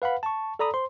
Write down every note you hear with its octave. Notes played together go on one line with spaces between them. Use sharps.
B4 F5 F#5 B5
A5 C#6
A4 D5 A#5 B5 D#6
C5 C6